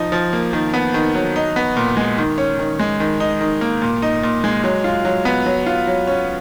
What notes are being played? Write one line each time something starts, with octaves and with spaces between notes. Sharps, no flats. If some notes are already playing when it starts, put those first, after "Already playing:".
Already playing: F3 D#4
F3
A#3
D#3
B3
D#3
F#3
D#4
B3
A#2
G#3
D#3
C#4
D#3
G#3
D#3
D#4
D#3
A#3
A#2
D#4
A#2
G#3
F#3
F4
F#3
B3
F#3
F4
F#3
C#4